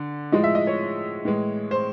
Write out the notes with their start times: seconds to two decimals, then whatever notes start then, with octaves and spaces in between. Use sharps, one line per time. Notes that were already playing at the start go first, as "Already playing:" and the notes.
Already playing: D3
0.32 A2 F3 G#3 D#5
0.44 E5
0.55 D#5
0.67 C#5
1.25 A2 E3 G#3
1.71 C5